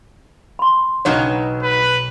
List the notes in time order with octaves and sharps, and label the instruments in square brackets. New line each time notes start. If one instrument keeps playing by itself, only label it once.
[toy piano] B5 C6
[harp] B1 E7 [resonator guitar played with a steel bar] C#3 F#3 D#4 [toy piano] C#5
[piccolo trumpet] B4